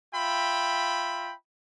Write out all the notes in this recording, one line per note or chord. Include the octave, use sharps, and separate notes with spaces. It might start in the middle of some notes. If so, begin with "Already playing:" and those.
F4 E5 G5 B5